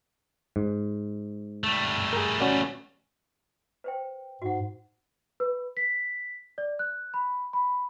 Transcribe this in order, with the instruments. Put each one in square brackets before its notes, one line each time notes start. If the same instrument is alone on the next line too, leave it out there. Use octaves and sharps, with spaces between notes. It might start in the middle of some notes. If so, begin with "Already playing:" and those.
[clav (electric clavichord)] G#2
[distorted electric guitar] G3 A3
[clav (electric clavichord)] G#4 A#4
C#4 F#4 D5
[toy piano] B4 C5 G5
[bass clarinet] G#2 [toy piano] F#4 F#5
[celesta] B4
B6
D5
F#6
B5
B5